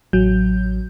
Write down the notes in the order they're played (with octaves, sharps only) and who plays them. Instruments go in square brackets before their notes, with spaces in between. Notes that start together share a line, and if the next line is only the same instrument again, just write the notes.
[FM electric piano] A1 F#3 G6